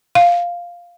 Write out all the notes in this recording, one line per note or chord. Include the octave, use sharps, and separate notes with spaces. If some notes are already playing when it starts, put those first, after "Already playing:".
F5